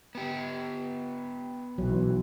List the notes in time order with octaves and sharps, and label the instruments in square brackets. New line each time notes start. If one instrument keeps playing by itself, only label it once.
[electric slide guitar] B3 G4
[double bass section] B1 E3 [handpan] F#3